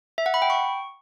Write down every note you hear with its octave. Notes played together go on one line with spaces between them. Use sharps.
E5
F#5
B5
G5
C#6